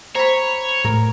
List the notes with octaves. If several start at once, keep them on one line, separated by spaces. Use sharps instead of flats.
C5 C#5 A#5 B5
A2 A#4